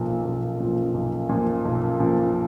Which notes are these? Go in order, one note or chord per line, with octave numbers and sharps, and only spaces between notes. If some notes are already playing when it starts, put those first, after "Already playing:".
Already playing: B1 A#2 F3
B1
A#2 F3
B1
A#2 F3
B1
A#2 F3